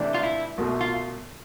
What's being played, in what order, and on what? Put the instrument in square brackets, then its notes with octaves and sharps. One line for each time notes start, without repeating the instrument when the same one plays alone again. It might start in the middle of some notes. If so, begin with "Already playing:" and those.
Already playing: [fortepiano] C3 E3 A3 D4
[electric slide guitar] F4
E4
[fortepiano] C2 B2 A3
[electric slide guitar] F4